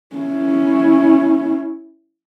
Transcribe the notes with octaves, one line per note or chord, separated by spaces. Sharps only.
C#4 E4